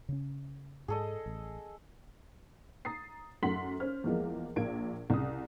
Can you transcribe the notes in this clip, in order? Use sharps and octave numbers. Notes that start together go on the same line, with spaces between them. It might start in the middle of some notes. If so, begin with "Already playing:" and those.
C#3 C#4
G#2 G#4 A4 D#5
A1
A#5 D#6 A6 C7
F#2 A3 F#5 C6 B6 F#7
C#4 C5 F6
E2 E3 F3 G#3 A#3
A#1 A#2 A#3 G#6 D7
C2 C#3 D#6